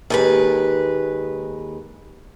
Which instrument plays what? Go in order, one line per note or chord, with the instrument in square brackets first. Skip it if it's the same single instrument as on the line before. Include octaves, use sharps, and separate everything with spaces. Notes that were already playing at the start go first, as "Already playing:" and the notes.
[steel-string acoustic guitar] D#2 G#3 B4